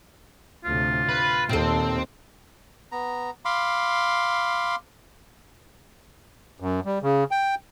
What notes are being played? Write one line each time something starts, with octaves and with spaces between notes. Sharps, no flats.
D2 A2 C3 F4
B4
D#2 A#2 C4 A4
B3 A#5
F5 B5 C6 D6
F#2
G3
C#3
G5